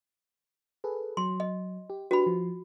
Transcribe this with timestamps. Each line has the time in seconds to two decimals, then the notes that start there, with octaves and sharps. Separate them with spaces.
0.84 G#4 A4 B4
1.17 F#3 C6
1.40 D#5
1.90 G4
2.11 D4 F#4 G4 B4 B5
2.26 F3